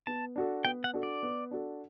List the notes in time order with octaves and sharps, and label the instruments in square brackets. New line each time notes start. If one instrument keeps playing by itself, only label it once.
[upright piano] B3 [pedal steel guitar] A5
[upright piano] D4 F#4 A4
[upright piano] B3 [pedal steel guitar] G5
[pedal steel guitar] F#5
[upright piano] D4 F#4 A4
[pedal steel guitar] D5
[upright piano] B3
D4 F#4 A4